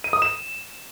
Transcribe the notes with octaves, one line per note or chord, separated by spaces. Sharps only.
D#7
D#6
E7